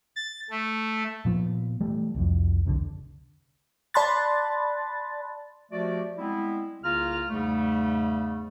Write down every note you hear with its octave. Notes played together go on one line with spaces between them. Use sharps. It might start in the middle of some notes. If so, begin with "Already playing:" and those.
A6
A3
A#2 F3 B3
E3 G3 A3
C2 F2
F#1 C2 A#2 D3
D5 A5 B5 C6 F#6 A6
F3 A3 F#4 G4 D5
G3 G#3 B3 C4 E4
C2 C#3 A#3 F4 A#5 F6
E2 G#2 C#3 G3 A3